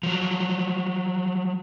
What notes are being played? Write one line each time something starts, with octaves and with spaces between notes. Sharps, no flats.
F3 F#3